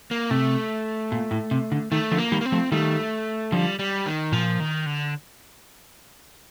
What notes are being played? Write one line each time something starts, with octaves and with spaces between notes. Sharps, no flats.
A#3
C3 A3
A#2
A2
C3
D3
D#3 A3
D3 F3
A#3
D#3 G3
A#3
C4
F3 A3
D#3 G3 A3
D3 F3 G3
G3
D#3
A#2 F3
D#3
D3